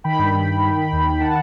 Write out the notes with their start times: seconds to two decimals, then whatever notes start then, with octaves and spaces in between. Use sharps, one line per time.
0.04 D#3 G5 B5
0.19 G2
0.34 G2
0.48 D#3
0.63 D#3
0.77 D#3
0.92 D#2
1.07 D#3
1.20 D#3 F#5 A5